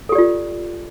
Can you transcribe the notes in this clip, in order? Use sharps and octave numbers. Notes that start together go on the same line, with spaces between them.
F4 G4 A4 D5